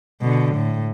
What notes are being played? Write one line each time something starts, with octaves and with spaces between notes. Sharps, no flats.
B2 D3
A2